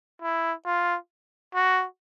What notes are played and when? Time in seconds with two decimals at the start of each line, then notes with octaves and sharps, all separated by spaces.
0.22 E4
0.65 F4
1.54 F#4